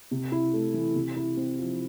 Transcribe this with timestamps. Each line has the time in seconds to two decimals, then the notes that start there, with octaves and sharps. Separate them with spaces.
0.11 C3
0.32 E4
0.54 A3
0.74 E3
0.95 C3
1.16 E4
1.37 C4
1.59 F3